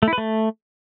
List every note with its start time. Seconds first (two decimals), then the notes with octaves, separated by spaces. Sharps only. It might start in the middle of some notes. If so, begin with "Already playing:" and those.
0.03 A3
0.08 E4
0.13 B4
0.18 A3